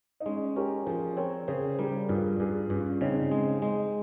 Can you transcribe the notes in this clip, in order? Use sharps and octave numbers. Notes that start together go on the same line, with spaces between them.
D#4
G#3 C#4
C#4 G4 A#4
F3 G#4 C5
C4 A#4 C#5
C#3 G#4 C5
G3 G4 A#4
G2 F4 G#4
G2 F4 G#4
G2 C#4 F4
C#3 C4 D#4
G#3
G#3